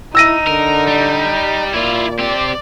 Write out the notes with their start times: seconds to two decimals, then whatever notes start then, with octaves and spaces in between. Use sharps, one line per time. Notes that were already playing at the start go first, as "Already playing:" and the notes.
0.15 D#4 E4 E6 A#6 D#7
0.47 D3 A#4
0.87 G3
1.74 A#2 E4 F4 D5
2.19 C4 G4 D5